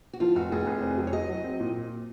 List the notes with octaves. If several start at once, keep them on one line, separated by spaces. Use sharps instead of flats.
F#4
F3 F4
F1 F#4
F1 G#4
F1
C4
F#3
C#5
F#3 D#5
F#3
C4
A#2